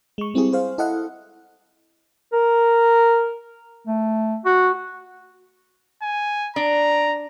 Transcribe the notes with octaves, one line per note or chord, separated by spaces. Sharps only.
G#3 C#6
G3 C4 E4 G4 G#4
G#4 C5 F5
E4 A4 D#5 F5 F#5
A#4
A3
F#4
G#5
D4 A#5